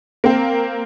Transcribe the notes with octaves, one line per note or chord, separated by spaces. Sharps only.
A#3 C4